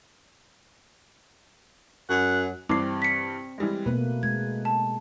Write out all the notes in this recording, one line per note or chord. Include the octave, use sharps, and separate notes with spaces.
F#2 F#5
G2 E3 G3 C4 D6 C7
B6 C#7
E3 G3 G#3
B2 A3 A#3 B4
G#3 G#6
A5